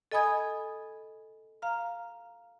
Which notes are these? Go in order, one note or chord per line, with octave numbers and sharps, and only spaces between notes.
A4 D#5 G#5 B5 D#6 G#6
F5 A#5 F6